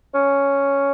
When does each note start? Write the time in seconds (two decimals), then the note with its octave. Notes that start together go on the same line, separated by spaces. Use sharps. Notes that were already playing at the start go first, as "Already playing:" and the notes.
0.14 C#4